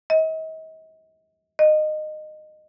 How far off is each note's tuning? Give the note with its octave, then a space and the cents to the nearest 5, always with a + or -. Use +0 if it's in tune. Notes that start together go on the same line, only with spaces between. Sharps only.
D#5 +40
D#5 -20